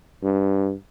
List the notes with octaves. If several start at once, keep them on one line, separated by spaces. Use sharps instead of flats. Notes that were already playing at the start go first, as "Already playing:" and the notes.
G2